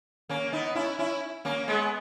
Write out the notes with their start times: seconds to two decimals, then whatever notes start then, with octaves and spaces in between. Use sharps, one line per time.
0.29 A#3 C#4
0.52 B3 D#4
0.75 C#4 E4
0.99 C#4 E4
1.45 A#3 C#4
1.68 G#3 B3